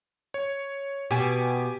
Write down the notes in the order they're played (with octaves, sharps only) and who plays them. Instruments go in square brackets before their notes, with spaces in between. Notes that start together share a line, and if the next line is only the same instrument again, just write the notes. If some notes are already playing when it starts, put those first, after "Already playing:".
[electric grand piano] C#5
[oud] B2 [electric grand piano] G4 G#5 D6